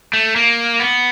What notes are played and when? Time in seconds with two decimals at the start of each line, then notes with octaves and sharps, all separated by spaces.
0.13 A3
0.36 A#3
0.80 B3